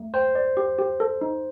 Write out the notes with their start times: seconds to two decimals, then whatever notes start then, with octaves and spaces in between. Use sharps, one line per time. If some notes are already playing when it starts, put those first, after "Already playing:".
Already playing: A3
0.14 C5 G5
0.35 D5
0.57 G4
0.79 G4
1.00 A4
1.21 D#4